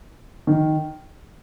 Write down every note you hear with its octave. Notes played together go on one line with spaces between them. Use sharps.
D#3